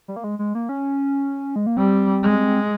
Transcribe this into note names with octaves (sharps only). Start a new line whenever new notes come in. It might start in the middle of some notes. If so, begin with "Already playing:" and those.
G3
A#3
G#3
G#3
A#3
C#4
G#3
A#3
G3 C4
G#3